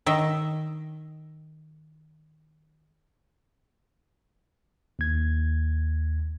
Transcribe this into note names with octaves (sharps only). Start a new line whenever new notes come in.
D#3 D#5 E5
D#2 G#6